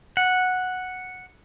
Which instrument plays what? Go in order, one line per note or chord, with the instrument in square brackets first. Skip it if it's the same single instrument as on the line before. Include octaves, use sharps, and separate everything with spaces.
[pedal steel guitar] F#5